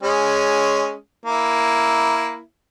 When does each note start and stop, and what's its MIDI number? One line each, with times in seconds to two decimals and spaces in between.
0.03 0.93 56
0.03 0.93 61
1.26 2.39 58
1.26 2.39 64